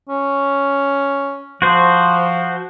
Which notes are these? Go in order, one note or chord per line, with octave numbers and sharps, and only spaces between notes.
C#4
F3 F#4 C5